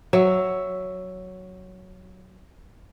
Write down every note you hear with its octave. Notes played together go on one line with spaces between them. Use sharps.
F#3 E5